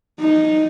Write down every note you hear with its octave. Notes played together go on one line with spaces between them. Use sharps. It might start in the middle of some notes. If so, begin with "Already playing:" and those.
D#4